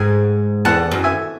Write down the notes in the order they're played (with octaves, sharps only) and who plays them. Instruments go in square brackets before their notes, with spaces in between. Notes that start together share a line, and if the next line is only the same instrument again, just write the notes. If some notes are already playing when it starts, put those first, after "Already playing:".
Already playing: [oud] G#2 [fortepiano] G#5
[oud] E2 [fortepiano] F#5 A5
[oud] F#2
[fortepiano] E5 G#5